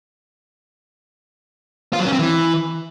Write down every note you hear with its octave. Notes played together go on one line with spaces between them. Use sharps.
F4
F#3
C#4
C4
E3